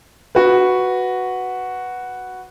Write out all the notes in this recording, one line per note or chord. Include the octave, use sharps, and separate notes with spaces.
F#4 B4